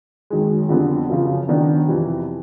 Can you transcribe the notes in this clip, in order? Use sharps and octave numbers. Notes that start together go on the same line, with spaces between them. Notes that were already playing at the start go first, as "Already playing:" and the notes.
F#2 D#3 G#3
F2 D3 G3 B3
F#2 C#3 F3
F#2 D#3 F#3 B3 D4
F2 C3 E3